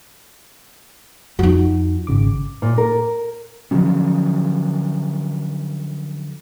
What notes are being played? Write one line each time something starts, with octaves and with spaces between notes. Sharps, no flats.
F2 D#4 F#4
G#1 C#3 D6
A#2
A#4
D3 F3 F#3 C#4